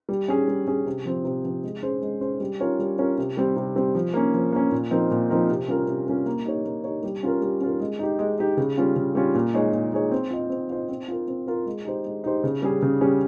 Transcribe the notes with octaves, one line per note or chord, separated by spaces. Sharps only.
G3
C#4 G#4
G3
C#4 G#4
C3
F3 C4
C3
F3 C4
G#3
C#4 G#4 C5
G#3
C#4 G#4 C5
G3
C#4 F4 A#4 C#5
G3
C#4 F4 A#4 C#5
C3
G3 C4 G4
C3
G3 C4 G4
F3
A#3 C#4
F3
A#3 C#4
A#2
F3 C4 D#4 A#4
A#2
F3 C4 D#4 A#4
C3
G3 C#4 F4 A#4
C3
G3 C#4 F4 A#4
A#3
D#4 G4 C#5
A#3
D#4 G4 C#5
G3
C#4 F4 A#4
G3
C#4 F4 A#4
G#3
D#4 G4
G#3
D#4 G4
C#3
G3 C#4 F4
C#3
G3 C#4 F4
A#2
G#3 D#4 G#4 C#5
A#2
G#3 D#4 G#4 C#5
C4
F4 C5 D#5
C4
F4 C5 D#5
C4
F4 A#4
C4
F4 A#4
G#3
D#4 G4 C5
G#3
D#4 G4 C5
C#3
G3 C#4 G#4
C#3
G3 C#4 G#4